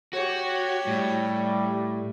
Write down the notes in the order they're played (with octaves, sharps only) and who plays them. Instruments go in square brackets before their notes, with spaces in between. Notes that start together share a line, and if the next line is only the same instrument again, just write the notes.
[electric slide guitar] F#4 [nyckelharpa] G4 C#5
[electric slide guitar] A2 [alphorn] G3